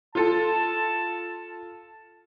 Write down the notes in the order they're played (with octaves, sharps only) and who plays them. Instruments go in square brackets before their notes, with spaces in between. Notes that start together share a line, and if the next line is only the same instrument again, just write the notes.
[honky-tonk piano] F4 A4 [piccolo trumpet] A5